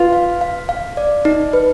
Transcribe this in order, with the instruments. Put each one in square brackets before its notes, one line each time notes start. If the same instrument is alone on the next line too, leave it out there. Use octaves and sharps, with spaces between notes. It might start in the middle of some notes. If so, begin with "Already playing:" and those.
Already playing: [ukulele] F4 [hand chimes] B4
[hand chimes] F5
F5
F5
D5
D#4
B4